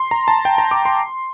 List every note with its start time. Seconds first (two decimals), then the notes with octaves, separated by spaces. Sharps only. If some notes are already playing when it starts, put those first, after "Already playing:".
Already playing: C6
0.11 A#5
0.28 A5
0.45 G5
0.58 A#5
0.71 D6
0.85 C6